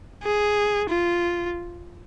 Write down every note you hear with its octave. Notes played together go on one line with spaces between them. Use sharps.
G#4
F4